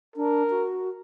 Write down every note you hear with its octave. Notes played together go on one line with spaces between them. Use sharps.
D4 A#4
F#4